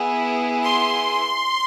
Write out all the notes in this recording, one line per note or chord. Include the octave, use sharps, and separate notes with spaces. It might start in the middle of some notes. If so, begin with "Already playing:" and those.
Already playing: B3 E4 G#4
C6